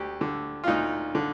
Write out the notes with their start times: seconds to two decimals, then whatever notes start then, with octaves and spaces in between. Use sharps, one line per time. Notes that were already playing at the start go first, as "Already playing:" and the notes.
Already playing: D2 G4
0.21 D3
0.64 F4
0.67 D2 D#4
1.15 D3